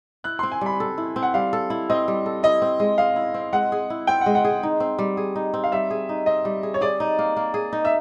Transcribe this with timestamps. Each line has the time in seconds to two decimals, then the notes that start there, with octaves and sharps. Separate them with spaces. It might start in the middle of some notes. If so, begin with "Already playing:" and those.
0.24 E4 F#6
0.39 C4 C6
0.52 G#5
0.61 G3 B5
0.80 A4
0.98 E4
1.16 C4
1.23 F#5
1.34 G3 F5
1.53 A4
1.70 E4
1.90 C4 D#5
2.08 G3
2.26 A4
2.43 E4 D#5
2.62 C4
2.80 G#3
2.98 G#4 F5
3.16 E4
3.34 C4
3.53 G#3 F#5
3.72 G#4
3.90 E4
4.07 C4 G5
4.21 F#5
4.26 G#3
4.35 F#5
4.44 G#4
4.63 D#4
4.80 C4
4.99 G3
5.17 G#4
5.36 D#4
5.54 C4
5.64 F5
5.72 G3 E5
5.90 G#4
6.09 D#4
6.26 C4 D#5
6.45 G3
6.63 G#4
6.74 C#5
6.81 G#4 D5
7.00 D#4
7.19 A#3
7.36 A#3
7.54 G#4
7.73 D#4
7.85 E5